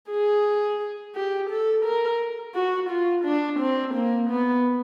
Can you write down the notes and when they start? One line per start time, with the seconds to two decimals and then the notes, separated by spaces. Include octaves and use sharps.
0.10 G#4
1.15 G4
1.50 A4
1.85 A#4
2.55 F#4
2.89 F4
3.25 D4
3.59 C4
3.94 A#3
4.30 B3